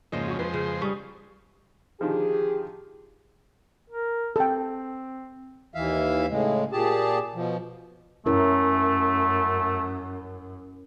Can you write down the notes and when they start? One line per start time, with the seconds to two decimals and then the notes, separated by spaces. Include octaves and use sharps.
0.12 F2 G#2 C#3 A#3 C5 D#5
0.27 F#4 C#6
0.39 F2 F3 G#3 B4 C5
0.54 C#3
0.82 G3 C#4 C#6 D#6
2.01 D3 D#3 F3 G4 G#4
3.90 A#4
4.36 C4 A4 G5
5.74 D#2 E3 E5 F5
6.30 A2 C#3 G#3
6.72 A#2 G4 G#4 A5
7.35 B2 F3
8.26 F#2 A3 C#4 E4 A#4